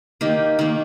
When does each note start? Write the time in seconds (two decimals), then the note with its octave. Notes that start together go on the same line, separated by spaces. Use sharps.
0.21 D#3 A#3 G4
0.59 D#3 A#3